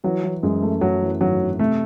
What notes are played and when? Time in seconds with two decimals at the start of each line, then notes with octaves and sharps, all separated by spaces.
0.04 E3 F#3
0.23 E3
0.43 F#2 G#3
0.63 A3
0.81 F#2 F#3
1.02 E3
1.20 G#1 F#3
1.40 G#1
1.59 C3 A3